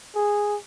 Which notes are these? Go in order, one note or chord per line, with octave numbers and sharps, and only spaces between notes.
G#4